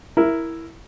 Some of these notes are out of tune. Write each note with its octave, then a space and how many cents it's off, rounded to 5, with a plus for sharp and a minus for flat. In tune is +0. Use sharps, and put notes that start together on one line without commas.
E4 +0 A#4 +0